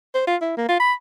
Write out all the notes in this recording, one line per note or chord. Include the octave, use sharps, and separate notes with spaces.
C5
F4
E4
A#3
F4
B5